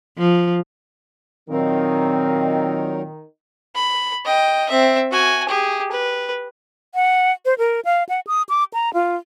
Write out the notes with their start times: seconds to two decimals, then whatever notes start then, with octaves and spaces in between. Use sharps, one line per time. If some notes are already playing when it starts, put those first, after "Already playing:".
0.18 F3
1.49 A#2 D#3 F#3 C4 D#4 A#4
3.75 B5
4.25 D#5 G5
4.69 C4 E5
5.11 F#4 G#5
5.48 G4 G#4
5.91 B4
6.95 F#5
7.45 C5
7.58 A#4
7.85 F5
8.09 F#5
8.27 D#6
8.49 D6
8.74 A#5
8.94 F4